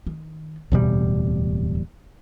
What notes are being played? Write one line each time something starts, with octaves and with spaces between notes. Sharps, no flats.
D#3
D1 E2 B2 G3 C4